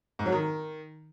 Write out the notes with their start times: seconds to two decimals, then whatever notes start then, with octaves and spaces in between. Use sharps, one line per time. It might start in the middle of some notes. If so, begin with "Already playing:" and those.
0.19 G#2
0.26 F#3
0.32 D#3